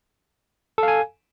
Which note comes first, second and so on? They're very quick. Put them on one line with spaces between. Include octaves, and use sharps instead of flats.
A4 F5 G#5